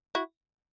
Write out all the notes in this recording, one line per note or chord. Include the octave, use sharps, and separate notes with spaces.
E4 F#4